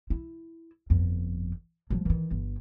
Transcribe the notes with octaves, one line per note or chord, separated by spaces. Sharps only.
E4
G1 F2
F3 F#3
D#3 E3
G1